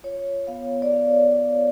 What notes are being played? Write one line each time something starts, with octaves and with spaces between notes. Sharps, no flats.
F4 C#5
B3 F5
D5
B3 F5